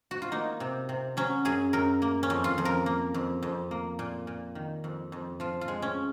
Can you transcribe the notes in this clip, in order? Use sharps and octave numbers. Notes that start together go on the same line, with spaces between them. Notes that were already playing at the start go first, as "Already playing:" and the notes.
F#4
F4
A#3 D#4
C3
C3
F#3 C#4
F#2 G#4
F#2 A#4
A#3
C#4
F2
F4
F2
A#4
A#3
F2
F2
A#3
A#2
A#2
D#3
F2
F2
F3 F4
F4
G#3
C#4